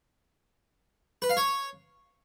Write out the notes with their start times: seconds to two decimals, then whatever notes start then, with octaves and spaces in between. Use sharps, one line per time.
1.22 B4
1.29 F5
1.37 C#5